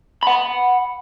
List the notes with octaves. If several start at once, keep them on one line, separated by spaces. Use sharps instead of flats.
F#5 B5